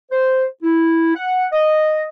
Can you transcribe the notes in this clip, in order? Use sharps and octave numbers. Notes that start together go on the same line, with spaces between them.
C5
E4
F#5
D#5